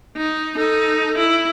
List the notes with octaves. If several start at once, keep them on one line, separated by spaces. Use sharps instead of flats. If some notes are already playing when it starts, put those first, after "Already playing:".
D#4
D#4 A4
E4